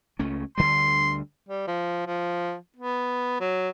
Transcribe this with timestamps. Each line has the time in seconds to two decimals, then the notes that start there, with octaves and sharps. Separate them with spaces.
0.19 C#2 A3 C#4
0.58 D2 D3 G3 C6
1.48 G3
1.67 F3
2.07 F3
2.77 B3
3.41 F#3